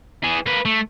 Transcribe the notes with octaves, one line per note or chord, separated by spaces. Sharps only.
E3 G#4
A#3 B4
A3